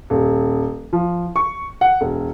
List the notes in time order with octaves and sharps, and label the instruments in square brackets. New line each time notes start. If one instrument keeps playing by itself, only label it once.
[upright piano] D#1
F3
C#6
F#5
E1